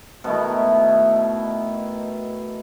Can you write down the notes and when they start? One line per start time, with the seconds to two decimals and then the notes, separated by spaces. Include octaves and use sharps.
0.24 B2 D#3 A3 E4